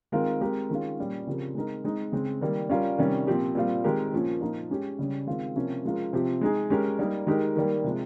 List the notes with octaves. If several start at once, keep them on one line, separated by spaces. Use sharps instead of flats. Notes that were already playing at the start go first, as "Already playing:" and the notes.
D#3 G#3 C4 F4 A#4
G#3 C4 G4 A#4
D#3 G#3 C#4 F4
A#2 G3 C#4
C#3 F3 C4 G4 A#4
G#3 C4 D#4 A#4
G#3 C4 D#4
C#3 G#3 C4
D#3 G3 A#3
G3 C#4 F4 A#4
C3 D#3 G3 C#4
A#2 F3 C4 G4
A#2 G3 C4 F4
D#3 G#3 C4 G4 A#4
A#2 F3 A#3 C#4
A#2 F3 A#3 D#4 A#4
G#3 C#4 G4
C#3 G3 C#4
D#3 G#3 C4 F4
C3 F3 A#3 C#4 F4
F3 G#3 C#4 F4 A#4
C3 F3 C4 G4
G#3 D#4 G#4
G#3 C#4 G4 A#4
G3 A#3 D#4 A#4
D#3 G#3 D#4 G4 A#4
D#3 G3 A#3
C3 F3 G#3